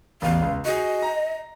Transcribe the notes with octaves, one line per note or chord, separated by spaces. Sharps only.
A1 E2 F5
C#2
F#4 G#4 D#5
A#5